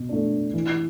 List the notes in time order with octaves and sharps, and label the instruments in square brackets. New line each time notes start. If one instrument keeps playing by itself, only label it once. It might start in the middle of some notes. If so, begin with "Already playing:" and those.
Already playing: [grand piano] B2
A3 D4
E3